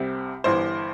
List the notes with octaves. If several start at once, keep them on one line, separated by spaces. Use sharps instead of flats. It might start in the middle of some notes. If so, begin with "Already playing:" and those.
Already playing: C2 C3 G3 C4
G1 G2 E3 C5